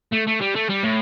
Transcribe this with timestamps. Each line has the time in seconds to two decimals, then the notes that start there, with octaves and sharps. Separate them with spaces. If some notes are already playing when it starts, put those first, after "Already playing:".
0.12 A3
0.27 A3
0.41 G3
0.55 A3
0.69 G3
0.83 A2